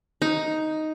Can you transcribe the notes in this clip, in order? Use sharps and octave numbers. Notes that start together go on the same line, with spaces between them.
D#4